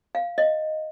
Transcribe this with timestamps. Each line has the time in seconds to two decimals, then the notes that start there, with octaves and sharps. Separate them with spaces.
0.15 F5
0.38 D#5